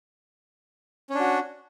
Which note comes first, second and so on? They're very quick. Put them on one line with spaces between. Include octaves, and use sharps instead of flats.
C#4 D4 F#4